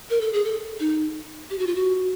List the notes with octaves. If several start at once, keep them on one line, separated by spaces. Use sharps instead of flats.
A#4
A4
G#4
A4
D#4
G4
F#4
F4
F#4